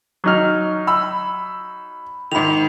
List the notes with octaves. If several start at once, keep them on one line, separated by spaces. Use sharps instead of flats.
F#3 D#4 F6
B5 E6
G#2 D#3 B5 F7